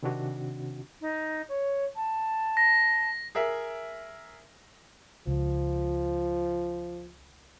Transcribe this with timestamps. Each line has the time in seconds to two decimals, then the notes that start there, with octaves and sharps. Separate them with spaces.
0.03 C3 D#3 C4 D4 F#4
1.01 D#4
1.49 C#5
1.96 A5
2.57 A#6
3.35 G#4 A#4 E5
5.27 C#2 F3